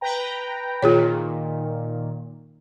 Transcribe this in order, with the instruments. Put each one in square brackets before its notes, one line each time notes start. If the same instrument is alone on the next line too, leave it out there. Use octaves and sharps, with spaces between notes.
[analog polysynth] B4 G5 A#5
[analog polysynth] A#2 D#3 [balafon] F4 G#4 C#5